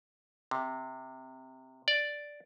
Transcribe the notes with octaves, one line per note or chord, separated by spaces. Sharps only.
C3
D5